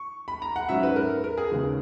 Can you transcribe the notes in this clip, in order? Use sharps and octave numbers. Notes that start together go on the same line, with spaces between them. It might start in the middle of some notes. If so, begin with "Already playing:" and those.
Already playing: C#6
B5
A#5
F#5
G#2 F#3 C#4 E5
B4
A#4
A#4
G#4
D#2 C#3 G#3 B3